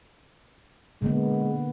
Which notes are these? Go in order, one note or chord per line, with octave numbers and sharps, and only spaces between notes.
D3 G#3 A#3 B3